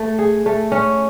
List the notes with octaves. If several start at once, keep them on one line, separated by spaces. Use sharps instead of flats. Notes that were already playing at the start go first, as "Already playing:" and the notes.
Already playing: A3
G#4
A3
C#4